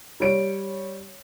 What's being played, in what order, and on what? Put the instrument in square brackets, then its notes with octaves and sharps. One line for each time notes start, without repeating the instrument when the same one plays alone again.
[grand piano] G3 C#5 D7